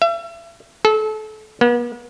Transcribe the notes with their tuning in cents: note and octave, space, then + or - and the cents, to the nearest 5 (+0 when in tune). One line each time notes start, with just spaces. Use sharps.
E5 +40
A4 -30
B3 -45